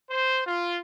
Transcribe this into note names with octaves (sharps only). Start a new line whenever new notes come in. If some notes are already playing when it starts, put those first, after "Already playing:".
C5
F4